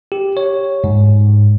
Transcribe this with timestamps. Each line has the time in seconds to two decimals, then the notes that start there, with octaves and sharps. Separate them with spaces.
0.12 G4
0.37 C#5
0.84 G#2